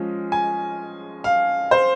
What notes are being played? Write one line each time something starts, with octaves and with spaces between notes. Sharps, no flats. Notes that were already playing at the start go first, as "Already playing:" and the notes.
Already playing: F3 G#3 C#4
G#5
F5
C5